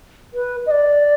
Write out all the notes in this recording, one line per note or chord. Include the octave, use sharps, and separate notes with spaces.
B4
D#5
D5